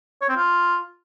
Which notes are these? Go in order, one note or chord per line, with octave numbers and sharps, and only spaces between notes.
C#5
C4
F4